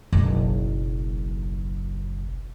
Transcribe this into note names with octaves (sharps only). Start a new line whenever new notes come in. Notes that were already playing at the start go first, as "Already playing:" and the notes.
F#1 B1